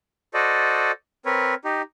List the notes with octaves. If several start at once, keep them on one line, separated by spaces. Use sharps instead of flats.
F#4 A4 C5 D5 D#5
C4 A#4 B4 C#5
D#4 G4